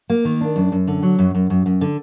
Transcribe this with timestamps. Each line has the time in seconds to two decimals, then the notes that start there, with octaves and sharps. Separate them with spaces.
0.10 A#3
0.25 D#3
0.41 D4
0.56 F#2
0.72 F#2
0.88 D3
1.03 F#3
1.19 F#2
1.35 F#2
1.50 F#2
1.66 F#2
1.81 D3